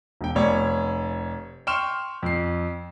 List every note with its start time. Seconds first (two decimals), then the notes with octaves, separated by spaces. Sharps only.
0.21 E1 G5
0.35 F1 C#5 D5
1.67 G5 C6 C#6 F6 E7
2.23 F2 C7